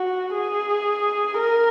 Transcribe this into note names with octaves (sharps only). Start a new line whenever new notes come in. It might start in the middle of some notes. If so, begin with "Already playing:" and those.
Already playing: F#4
G#4
A#4